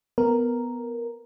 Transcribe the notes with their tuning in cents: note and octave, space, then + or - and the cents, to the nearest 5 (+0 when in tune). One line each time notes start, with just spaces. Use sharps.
B3 +0 A#4 +0